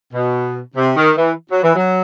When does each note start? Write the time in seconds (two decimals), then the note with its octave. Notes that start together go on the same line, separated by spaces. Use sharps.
0.14 B2
0.76 C3
0.96 D#3
1.18 E3
1.51 F#3
1.63 E3
1.75 F#3